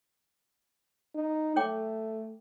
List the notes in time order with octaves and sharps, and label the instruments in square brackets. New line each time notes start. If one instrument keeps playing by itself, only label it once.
[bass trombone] D#4
[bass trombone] A3 [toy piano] C#5 G5 D6